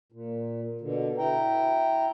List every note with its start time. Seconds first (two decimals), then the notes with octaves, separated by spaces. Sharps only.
0.12 A#2
0.81 B2 D3
1.18 E4 G5 A#5